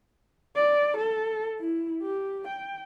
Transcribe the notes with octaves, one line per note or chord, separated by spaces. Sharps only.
D5
A4
E4
G4
G5